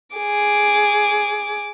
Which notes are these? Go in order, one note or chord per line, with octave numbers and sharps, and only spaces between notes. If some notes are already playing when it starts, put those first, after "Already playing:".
G#4 D6